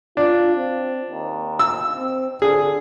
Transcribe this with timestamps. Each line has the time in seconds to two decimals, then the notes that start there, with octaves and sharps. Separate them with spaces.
0.17 D4 F4
0.56 C4
1.10 D#2
1.59 E6
1.97 C4
2.42 D3 G#4